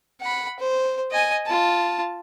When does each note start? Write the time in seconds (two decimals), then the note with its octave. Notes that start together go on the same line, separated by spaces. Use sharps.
0.21 F#5 B5
0.59 C5
1.11 D#5 G#5
1.46 F4 A5